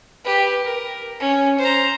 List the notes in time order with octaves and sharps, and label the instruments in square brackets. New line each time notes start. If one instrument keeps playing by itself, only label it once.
[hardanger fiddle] G4 B4
A#4
C#4
C5 A#5